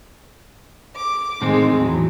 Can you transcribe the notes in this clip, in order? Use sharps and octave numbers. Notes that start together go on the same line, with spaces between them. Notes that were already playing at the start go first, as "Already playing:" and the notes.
D6
A2 D#3 G#3 C4
E2 F#3